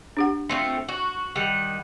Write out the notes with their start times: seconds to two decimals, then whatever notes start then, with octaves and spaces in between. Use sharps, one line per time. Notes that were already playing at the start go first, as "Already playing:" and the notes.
0.17 D4 G4 F#5
0.49 A3 C4 F4 C6
0.89 F#4
1.35 D#3 G3 F#5